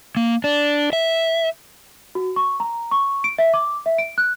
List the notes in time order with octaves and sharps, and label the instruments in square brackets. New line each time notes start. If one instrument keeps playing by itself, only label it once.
[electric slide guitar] A#3
D4
E5
[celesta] F#4
C#6
A#5
C#6
D7
E5
D6
E5
D7
F#6